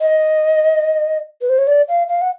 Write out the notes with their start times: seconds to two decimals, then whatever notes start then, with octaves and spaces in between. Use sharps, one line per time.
0.01 D#5
1.41 B4
1.49 C5
1.58 C#5
1.67 D5
1.89 F5
2.08 F5
2.22 F#5